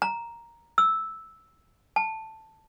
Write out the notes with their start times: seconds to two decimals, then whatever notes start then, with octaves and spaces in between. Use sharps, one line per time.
0.02 A#5
0.78 E6
1.96 A5